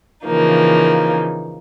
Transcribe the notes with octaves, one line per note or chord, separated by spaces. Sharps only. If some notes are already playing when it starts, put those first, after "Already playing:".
C#3 E3 F3 A#3 D#4